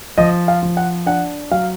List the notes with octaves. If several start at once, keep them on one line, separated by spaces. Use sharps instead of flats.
F3 D#5
F5
F3
F#5
D4 F#5
F#3 F5